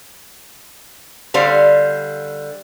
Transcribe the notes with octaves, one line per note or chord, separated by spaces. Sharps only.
D3 G3 C5 F5